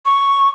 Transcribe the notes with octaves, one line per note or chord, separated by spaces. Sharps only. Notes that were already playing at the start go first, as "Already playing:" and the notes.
C#6